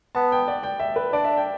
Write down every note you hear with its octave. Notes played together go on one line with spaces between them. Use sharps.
B3 A5
G5
D5
G5
E5
B4
D4 D5
E5
G5